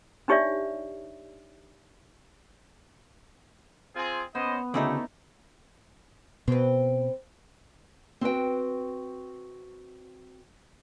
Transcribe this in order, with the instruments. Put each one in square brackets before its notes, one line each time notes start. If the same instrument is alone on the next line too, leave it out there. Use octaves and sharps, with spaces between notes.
[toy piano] D4 D#4 G4 C#5 D5 E5
[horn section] C4 F4 G#4
[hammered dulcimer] B3 [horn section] C#4 C5 D#5
[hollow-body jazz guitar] D2 C#3 [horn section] A3 [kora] D#4 E4 D5
[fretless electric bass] B2 [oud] C4 B4
[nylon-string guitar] C4 F#4 B4 G5